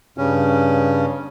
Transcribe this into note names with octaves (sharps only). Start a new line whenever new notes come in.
G2 C#3 C#4